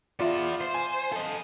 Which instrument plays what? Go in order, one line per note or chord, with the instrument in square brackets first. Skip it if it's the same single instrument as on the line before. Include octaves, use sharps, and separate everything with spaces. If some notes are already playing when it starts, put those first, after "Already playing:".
[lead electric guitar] B3 E5 [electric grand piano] F4 D5
[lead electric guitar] C5
[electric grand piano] G#5
[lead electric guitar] A4 D#5